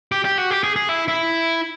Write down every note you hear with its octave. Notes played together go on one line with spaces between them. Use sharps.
G4
G4
F#4
G4
G#4
G#4
E4
E4